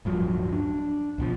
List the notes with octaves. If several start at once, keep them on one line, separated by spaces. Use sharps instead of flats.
D1 G2 F3 F#3
D4
C#2 B2 F3